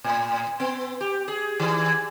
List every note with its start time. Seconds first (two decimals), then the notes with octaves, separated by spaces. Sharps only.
0.04 A2
0.60 B3
1.01 G4
1.28 G#4
1.60 D#3